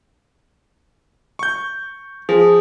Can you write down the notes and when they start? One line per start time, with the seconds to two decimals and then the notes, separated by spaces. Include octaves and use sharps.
1.39 C#6 G6
2.29 F3 G#4